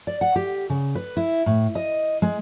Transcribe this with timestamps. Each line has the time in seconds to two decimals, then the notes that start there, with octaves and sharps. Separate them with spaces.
0.07 D5
0.21 F#5
0.36 G4
0.70 C#3
0.95 B4
1.17 E4
1.46 A2
1.75 D#5
2.22 G#3